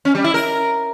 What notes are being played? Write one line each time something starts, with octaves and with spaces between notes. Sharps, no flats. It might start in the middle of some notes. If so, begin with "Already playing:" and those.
C#4
G3
E4
A#4